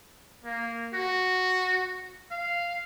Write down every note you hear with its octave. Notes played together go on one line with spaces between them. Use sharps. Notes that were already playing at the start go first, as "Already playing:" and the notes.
A#3
F#4
F5